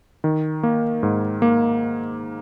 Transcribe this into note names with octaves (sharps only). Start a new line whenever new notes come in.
D#3
A#3
G#2
A#3